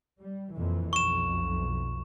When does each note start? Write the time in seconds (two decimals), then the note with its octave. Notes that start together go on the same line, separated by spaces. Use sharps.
0.20 G3
0.54 F2 A#2 E3
0.93 B1 F2 C#6 E7